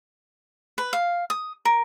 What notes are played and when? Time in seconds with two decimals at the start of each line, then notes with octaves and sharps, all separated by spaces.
0.78 B4
0.93 F5
1.30 D#6
1.65 A#4